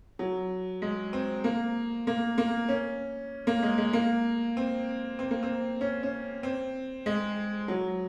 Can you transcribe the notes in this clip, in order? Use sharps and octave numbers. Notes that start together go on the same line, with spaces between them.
F#3
G#3
C4
A#3
A#3
A#3
C#4
A#3
G#3
G#3
A#3
C4
C4
A#3
C4
C#4
C#4
C4
G#3
F#3